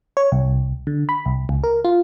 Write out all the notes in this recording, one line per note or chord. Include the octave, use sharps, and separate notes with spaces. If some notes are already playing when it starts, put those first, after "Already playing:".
C#5
C2
D3
B5
C2
C#2
A#4
F4